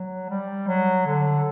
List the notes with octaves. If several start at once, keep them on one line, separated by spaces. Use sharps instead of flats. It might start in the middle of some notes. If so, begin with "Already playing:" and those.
Already playing: F#3
G3
F#3
D3